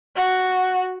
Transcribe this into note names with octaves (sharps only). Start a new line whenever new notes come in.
F#4